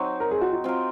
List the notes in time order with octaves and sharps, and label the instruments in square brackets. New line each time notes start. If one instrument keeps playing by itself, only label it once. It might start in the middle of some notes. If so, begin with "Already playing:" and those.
Already playing: [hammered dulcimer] F#3 C4 D#4
[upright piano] A#4
G#4
F#4
F#4
[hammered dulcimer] C4 F4 A#4